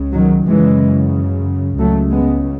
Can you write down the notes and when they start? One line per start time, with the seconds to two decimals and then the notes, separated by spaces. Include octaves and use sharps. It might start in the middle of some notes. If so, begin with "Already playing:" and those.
Already playing: C#2 C#3
0.13 D#3 F#3
0.46 F#2 C#3 E3 G#3
1.78 C#2 C#3 F#3 A3
2.12 G#3 B3